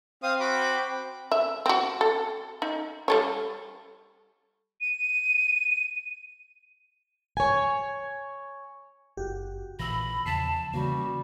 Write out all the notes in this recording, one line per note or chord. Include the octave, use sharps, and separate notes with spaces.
C4 F5 D#6
F#4 B5 D6
E5
C4 F#4
A4
D#4
G3 A4 C#5
D#7
C#5 G#5
F#1 F#4 G4
A#1 A#2 E3 B5 E6 A#6
E2 C#3 F3 A5 A6 B6 C7
C#3 E3 G3 A#3 F#4